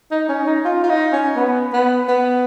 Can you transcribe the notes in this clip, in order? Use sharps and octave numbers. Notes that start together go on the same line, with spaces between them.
D#4
C#4
D#4
F4
F4
D#4
C#4
B3
B3
B3